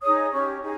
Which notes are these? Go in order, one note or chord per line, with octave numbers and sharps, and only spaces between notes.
D#4 G#4 C#5 D#6
C#4 G4 C#5 C#6
D#4 G#4